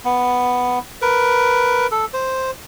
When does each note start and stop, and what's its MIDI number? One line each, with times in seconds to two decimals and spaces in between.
0.05 0.79 59
1.02 1.87 70
1.02 1.87 71
1.91 2.05 69
2.14 2.51 72